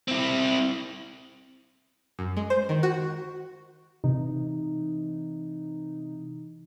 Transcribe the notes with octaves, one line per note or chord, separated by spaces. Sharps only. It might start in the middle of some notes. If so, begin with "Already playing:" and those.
C4 E4
F#2
G#3
C5
D#3
F#4
C3 E3 D#4